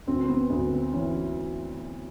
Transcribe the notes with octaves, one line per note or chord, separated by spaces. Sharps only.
D2 C4
C4
B3
D2 B3
C4
E3 C#4